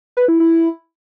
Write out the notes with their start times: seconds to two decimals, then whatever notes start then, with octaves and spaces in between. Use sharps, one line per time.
0.17 B4
0.28 E4
0.40 E4